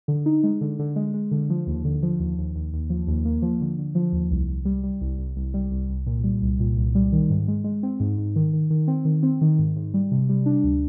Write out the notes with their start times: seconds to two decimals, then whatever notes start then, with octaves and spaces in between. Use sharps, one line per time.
0.08 D3
0.26 D#4
0.43 G#3
0.61 D3
0.79 D3
0.96 G#3
1.14 G#3
1.31 D3
1.50 F3
1.67 D#2
1.85 D3
2.03 F3
2.19 D#2
2.38 D#2
2.55 D#2
2.73 D#2
2.90 F3
3.07 D#2
3.25 A#3
3.42 F3
3.61 D3
3.78 D3
3.95 F3
4.12 D#2
4.30 C2
4.49 C2
4.65 G3
4.84 G3
5.01 C2
5.19 C2
5.36 C2
5.54 G3
5.71 C2
5.89 C2
6.06 A#2
6.24 G3
6.42 C2
6.60 A#2
6.77 C2
6.95 G3
7.12 D#3
7.30 G#2
7.48 G#3
7.64 G#3
7.83 C4
8.00 G#2
8.18 G#2
8.36 D#3
8.53 D#3
8.70 D#3
8.88 C4
9.05 D#3
9.23 C4
9.41 D#3
9.59 G#2
9.76 G#2
9.94 G3
10.11 C3
10.29 G3
10.46 D4
10.64 D2